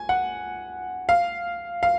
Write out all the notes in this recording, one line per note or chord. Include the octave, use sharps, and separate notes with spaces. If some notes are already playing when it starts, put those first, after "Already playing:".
Already playing: G#5
F#5
F5
F5